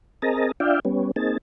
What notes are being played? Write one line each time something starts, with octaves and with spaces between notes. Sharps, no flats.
C4 G#4 A#4 D#5 A5 A#5
D4 F4 D5 E5 F5 G5
G3 B3 C#4
A#3 C4 D#4 G#4 A5